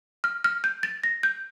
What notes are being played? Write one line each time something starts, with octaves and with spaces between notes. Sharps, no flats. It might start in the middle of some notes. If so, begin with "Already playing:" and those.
F6
F6
G6
A6
A#6
G6